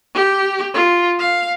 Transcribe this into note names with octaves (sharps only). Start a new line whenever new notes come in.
G4
F4
F5